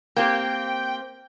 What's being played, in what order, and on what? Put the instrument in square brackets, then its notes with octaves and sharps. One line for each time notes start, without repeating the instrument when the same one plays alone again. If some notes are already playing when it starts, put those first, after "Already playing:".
[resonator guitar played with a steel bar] A#3 C4 G4 [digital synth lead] G5